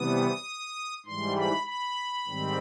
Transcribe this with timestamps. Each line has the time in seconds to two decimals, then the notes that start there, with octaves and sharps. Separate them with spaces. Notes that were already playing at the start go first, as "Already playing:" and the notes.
Already playing: C3 E3 G3 B3 D#6
1.06 G#2 E3 G3 C6
1.36 B5
1.67 B5
2.28 G#2 D#3 G3 C4